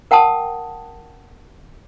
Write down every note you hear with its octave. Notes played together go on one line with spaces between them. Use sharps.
A#4 F#5 G5 A5 D#6